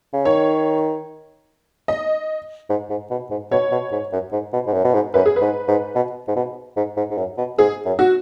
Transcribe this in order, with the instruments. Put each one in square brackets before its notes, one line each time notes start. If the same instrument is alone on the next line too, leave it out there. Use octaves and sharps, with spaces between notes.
[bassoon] C#3
[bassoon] D#3 [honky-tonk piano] C#5
[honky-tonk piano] D#5
[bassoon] G#2
G#2
B2
G#2
[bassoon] B2 [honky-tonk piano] C#5
[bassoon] B2
G#2
F#2
G#2
B2
G#2
F#2
B2
G#2
[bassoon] F#2 [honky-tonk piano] B4
[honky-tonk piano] G#4
B4
[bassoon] G#2
G#2
B2
G#2
B2
G#2
G#2
G#2
F#2
B2
[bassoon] G#2 [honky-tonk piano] G#4
[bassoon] F#2
[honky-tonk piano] F#4